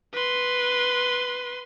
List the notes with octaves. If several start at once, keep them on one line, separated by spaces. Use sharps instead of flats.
B4 C6